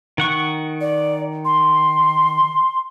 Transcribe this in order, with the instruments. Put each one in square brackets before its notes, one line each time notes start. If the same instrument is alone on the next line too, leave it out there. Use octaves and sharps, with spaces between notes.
[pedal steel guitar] D#3 F#5 C#6
[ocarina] D5
C6